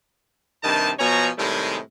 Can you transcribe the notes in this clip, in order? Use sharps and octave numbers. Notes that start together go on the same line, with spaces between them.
G2 C3 D#3 D#5 A5
B2 F3 C#5 G#5 A#5
A2 C3 D#3 G3 G#3